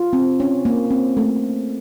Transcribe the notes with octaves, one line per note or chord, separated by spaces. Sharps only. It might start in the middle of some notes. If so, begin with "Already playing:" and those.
Already playing: F4
C4
C#4
A#3
C4
A3